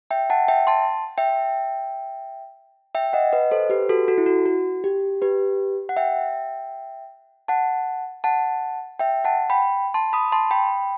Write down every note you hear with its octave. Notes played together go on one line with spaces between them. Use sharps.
E5 G5
F#5 A5
E5 G5
A5 C6
E5 G5
E5 G5
D#5 F#5
B4 D#5
A4 C5
G4 B4
F#4 A4
F#4 A4
E4
F#4
F#4
G4
G4 B4
F#5
E5 G5
F#5 A5
F#5 A5
E5 G5
F#5 A5
G5 B5
A5 C6
B5 D#6
A5 C6
G5 B5